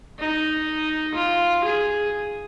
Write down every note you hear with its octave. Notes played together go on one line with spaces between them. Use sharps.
D#4
F4
G#4